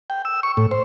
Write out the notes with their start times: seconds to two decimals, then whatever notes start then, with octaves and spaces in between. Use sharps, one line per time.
0.10 G5
0.25 E6
0.43 C#6
0.57 A2
0.71 C5